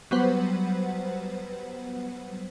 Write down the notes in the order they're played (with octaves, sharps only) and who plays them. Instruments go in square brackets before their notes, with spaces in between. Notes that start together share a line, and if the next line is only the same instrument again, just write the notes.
[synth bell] F#3 G3 B3 B4 C5 F#5